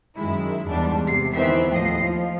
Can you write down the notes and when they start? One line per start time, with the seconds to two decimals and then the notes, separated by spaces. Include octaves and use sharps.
0.15 F#2 D#3 G#3 E4
0.68 E2 G#2 G3 D4
1.06 C3 C7
1.35 E2 D#3 E3 B3 C4 E5
1.70 D#2 A2 F3 D#5 C7
1.99 F3